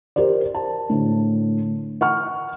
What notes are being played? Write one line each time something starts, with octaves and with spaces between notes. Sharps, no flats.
G4 A#4 C5 D5
A5
A2 D3
F#5 C#6 F6